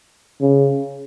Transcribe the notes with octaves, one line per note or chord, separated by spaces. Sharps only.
C#3